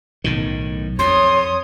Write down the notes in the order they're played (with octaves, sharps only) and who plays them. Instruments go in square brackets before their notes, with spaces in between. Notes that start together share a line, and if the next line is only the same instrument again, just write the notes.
[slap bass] B1 A2 D#3
[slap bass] F2 [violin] C#5 D#6 [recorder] C6